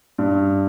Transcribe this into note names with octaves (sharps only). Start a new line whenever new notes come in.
G2